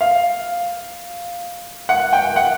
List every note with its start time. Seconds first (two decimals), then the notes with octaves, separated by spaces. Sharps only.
0.01 F5
1.89 F#5
2.13 G5
2.36 F#5